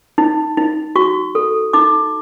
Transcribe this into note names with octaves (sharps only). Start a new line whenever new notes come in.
D#4
D#4
F#4 C#6
A4
D#4 D6